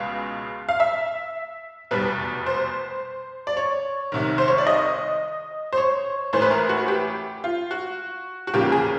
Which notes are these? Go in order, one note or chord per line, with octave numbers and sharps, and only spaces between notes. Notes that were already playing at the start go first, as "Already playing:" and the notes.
Already playing: C#2 B2 G#3 F5
F5
E5
F1 E2 B2 G3 B4
C5
D5
C#5
C2 C3 D#3
C5
C#5
D5
D#5
C5
C#5
A1 A2 E3 A3 C5
B4
A#4
F#4
G4
F4
F#4
F#4
E2 C#3 F3 A#3 G4
G#4